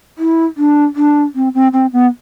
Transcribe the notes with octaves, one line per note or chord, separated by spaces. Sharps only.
E4
D4
D4
C4
C4
C4
B3